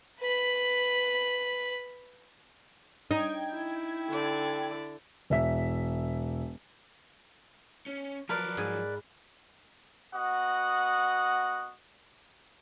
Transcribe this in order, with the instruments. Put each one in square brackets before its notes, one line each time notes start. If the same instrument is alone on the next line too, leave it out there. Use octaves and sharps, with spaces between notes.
[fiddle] B4 B5
[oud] D#4 [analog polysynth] G5 G#6
[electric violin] E4
[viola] D3 D5
[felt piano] E1 E5 B6
[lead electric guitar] C#4
[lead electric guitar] F3 F#3 [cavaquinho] A#4 B4 D5
[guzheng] G#2 G#4
[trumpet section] B3 F#4 D#5 F#5 D#6